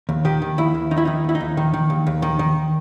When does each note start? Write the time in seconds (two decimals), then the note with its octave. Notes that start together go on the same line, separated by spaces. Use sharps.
0.09 D#2
0.25 D#3 G4
0.42 D#3
0.58 D#2 E4
0.74 D#2
0.91 D#3 D#4
0.98 E4
1.05 D#3 D#4
1.24 D#2 E4
1.35 D#4
1.40 D#2
1.57 D#3
1.74 D#3
1.90 D#2
2.07 D#2
2.22 D#3
2.39 D#3